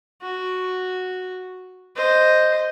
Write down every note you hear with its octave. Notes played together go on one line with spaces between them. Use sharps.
F#4
C5 D#5